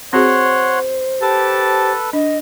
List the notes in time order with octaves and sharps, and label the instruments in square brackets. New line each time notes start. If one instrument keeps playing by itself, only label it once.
[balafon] C4 F#4 G#4 [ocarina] C5 [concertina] C#5 F#5 C6
[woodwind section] G4 A5 [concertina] A4 B4
[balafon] D4 [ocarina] D#5